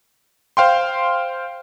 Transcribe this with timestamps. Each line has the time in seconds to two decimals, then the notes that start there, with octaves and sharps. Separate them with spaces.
0.57 C5 F5 G5 C6